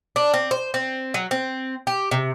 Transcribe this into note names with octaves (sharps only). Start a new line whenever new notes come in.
D4
C4
C5
C4
F#3
C4
G4
C3